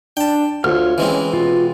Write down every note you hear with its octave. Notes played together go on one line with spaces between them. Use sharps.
D4 G5 A5
D2 F4 C#5 F6
E3 G#3 C4 C#4
B2 F4